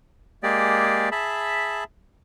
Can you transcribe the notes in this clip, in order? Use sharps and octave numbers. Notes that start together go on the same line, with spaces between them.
G#3 A#3 G4 G#4 D5
G#4 E5 A5 B5